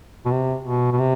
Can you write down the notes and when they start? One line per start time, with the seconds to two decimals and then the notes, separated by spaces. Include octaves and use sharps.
0.26 B2
0.31 C3
0.64 B2
0.92 B2
0.99 C3